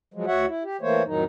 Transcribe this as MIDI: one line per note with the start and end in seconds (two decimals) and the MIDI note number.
0.14 0.26 53
0.14 0.26 54
0.14 0.26 56
0.27 0.46 38
0.27 0.46 66
0.27 0.46 73
0.27 0.46 76
0.27 0.46 78
0.47 0.63 64
0.64 0.77 67
0.81 1.03 52
0.81 1.03 57
0.81 1.03 58
0.81 1.03 72
0.81 1.03 73
1.05 1.24 41
1.05 1.24 45
1.05 1.24 51
1.05 1.24 54
1.05 1.24 63